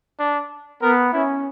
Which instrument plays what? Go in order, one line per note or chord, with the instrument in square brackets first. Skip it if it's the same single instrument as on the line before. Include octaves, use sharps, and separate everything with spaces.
[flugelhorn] D4
[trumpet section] B3 [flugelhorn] A#4
[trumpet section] C#4 [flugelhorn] E4